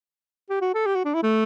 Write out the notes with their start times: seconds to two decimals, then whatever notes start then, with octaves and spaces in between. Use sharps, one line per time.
0.50 G4
0.61 F#4
0.74 A4
0.86 G4
0.95 F#4
1.05 D4
1.14 E4
1.23 A3